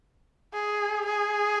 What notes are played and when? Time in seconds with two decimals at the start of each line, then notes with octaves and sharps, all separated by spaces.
0.54 G#4
1.07 G#4